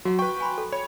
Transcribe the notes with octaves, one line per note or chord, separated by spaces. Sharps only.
F#3 F#4 F#5
B4 G5 C#6
G#5 B5 C6
A4
C#5 B5